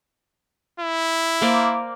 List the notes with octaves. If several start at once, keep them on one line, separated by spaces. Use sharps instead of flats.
E4
A#3 C5 D5